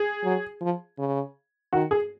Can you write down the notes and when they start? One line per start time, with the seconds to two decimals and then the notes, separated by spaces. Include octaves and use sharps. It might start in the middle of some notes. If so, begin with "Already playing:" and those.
Already playing: G#4
0.24 F#3
0.61 F3
0.98 C#3
1.73 D#3 F#4
1.91 G#4